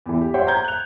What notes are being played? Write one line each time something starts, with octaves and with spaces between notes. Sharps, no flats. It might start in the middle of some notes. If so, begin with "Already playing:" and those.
E2 E3
G4
C5 C#5 E5 F#5 G5 C6
A#5 G6 G#6
F#6 F7